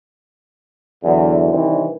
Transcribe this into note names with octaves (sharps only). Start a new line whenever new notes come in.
E2 D3 F#3
C2 D#3 E3 C4 D4 E4